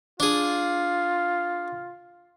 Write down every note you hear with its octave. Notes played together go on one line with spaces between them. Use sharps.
D4 F4 G#4